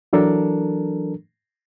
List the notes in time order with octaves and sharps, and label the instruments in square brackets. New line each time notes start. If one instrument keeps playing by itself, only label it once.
[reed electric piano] E3 F#3 D4 A4 A#4